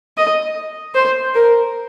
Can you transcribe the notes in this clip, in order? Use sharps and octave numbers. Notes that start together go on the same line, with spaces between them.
D#5
C5
A#4